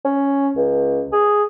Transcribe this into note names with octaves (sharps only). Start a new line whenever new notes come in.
C#4
C#2
G#4